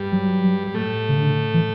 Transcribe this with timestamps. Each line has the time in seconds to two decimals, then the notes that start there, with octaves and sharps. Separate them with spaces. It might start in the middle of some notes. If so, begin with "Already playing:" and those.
Already playing: G2 G3
0.12 F#3
0.67 G3
0.75 A2 A3
1.09 C#3
1.17 D3
1.54 E3